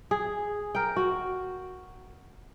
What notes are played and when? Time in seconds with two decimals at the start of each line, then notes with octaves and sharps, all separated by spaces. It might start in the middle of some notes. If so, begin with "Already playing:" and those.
0.11 G#4
0.75 A#4 G5
0.96 F#4